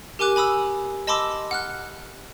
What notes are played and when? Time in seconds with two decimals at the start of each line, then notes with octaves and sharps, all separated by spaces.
0.19 G4 A#4 G#5 D6 F#6
0.36 G#5 B5 D#6 E6
1.07 D#5 A5 B5 C6 D6 E6
1.51 F#5 F6 F#6